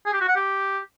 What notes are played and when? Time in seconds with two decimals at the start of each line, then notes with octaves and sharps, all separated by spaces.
0.06 G#4
0.13 G4
0.21 F#4
0.28 F#5
0.36 G4